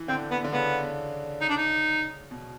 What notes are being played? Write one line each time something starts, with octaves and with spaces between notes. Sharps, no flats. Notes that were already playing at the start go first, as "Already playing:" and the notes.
Already playing: E3
D3 C4
B3
D3
C#3 B3
D#4
D4
D#4
B2